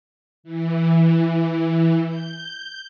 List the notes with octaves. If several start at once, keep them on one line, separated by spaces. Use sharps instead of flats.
E3
G6